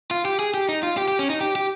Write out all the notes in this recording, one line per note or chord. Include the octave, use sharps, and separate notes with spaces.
F4
G4
G#4
G4
D#4
F4
G4
G4
C#4
D#4
G4
G4